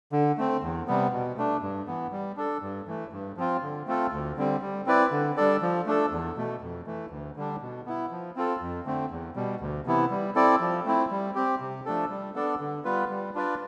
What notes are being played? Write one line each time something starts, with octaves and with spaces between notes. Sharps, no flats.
D3
A3 C4
E2
C3 G3 B3
B2
A3 D4
G2
E3 B3
G3
D4 A4
G2
E3 A3
G2
F3 C4 F4
D3
A3 C4 F4 A4
D2
D3 G3 C4
G3
C4 E4 B4 D5
D3
G3 D4 A4 D5
F3
A3 D4 A4
E2
B2 A3
F2
E3 A3
D2
D3 G3 D4
B2
B3 E4
F3
C4 F4 A4
F2
D3 A3 C4
E2
B2 G3
D2
C3 E3 B3 E4
G3
C4 E4 A4 D5
F3
A3 C4 E4
G3
C4 G4
C3
F3 A3 D4 A4
G3
B3 D4 A4 D5
D3
G3 B3 F4 B4
G3
D4 F4 B4 D5